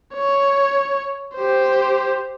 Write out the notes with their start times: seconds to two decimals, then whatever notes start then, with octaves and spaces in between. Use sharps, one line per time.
0.14 C#5
1.36 G4 C5